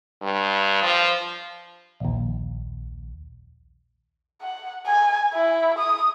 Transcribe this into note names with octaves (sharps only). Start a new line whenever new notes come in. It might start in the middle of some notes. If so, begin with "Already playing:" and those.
G2
F3
A#1 D#2
F#5
G#5
E4
D#6